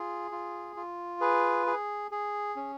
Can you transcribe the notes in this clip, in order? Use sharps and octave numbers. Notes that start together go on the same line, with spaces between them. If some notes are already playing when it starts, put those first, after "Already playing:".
Already playing: F4 G#4
F4
F4
G#4 B4
G#4
G#4
C#4